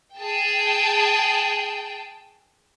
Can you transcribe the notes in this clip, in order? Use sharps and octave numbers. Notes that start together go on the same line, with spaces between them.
G#4 G5 A5